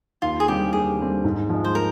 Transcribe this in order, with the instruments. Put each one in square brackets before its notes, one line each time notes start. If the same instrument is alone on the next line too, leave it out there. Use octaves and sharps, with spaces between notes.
[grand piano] D#2 [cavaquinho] F4
[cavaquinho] G#4
[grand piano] D3 G3 C4 [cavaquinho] G4
[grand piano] D#2 [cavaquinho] G#4
[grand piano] D3 G3 C4
G#2
F3 G#3
[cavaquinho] C5
A#4